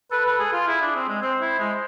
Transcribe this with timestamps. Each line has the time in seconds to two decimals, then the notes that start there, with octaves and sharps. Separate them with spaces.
0.11 A4 B4
0.25 B4
0.39 G#4
0.53 F4
0.67 E4 G#4
0.81 D4
0.95 C4
1.09 G#3
1.22 C4 C5
1.41 E4
1.59 G#3